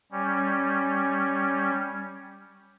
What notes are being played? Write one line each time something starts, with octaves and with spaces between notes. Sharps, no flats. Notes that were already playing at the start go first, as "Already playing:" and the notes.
G3 C#4